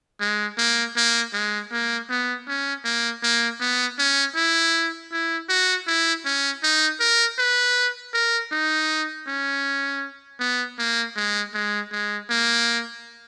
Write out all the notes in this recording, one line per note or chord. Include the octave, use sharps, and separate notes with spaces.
G#3
A#3
A#3
G#3
A#3
B3
C#4
A#3
A#3
B3
C#4
E4
E4
F#4
E4
C#4
D#4
A#4
B4
A#4
D#4
C#4
B3
A#3
G#3
G#3
G#3
A#3